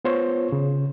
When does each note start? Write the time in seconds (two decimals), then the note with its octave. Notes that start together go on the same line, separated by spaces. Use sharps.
0.05 B3 F4 C5 C#5
0.52 C#3